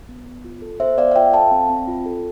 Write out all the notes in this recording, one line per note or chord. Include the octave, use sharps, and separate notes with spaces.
B3
B3
F4
A4
B3 C5 E5
B3 D5 F5
F5
F4 E5 G5
A4 F5 A5
C4
C4
F4
A4